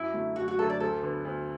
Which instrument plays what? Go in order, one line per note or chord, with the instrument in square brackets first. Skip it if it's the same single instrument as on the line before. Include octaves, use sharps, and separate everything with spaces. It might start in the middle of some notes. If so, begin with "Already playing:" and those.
Already playing: [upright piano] F#2 [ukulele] E4
[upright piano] D3 F#3 A3
[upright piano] F#2 [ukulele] F#4
[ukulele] F#4
[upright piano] D3 F#3 A3 [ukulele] A4
[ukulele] D5
[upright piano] D2 [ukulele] A4
[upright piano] D3 B3
D2